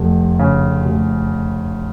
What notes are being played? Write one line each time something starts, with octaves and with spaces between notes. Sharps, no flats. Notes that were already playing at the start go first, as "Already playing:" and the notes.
Already playing: F1 F2
C#3
F1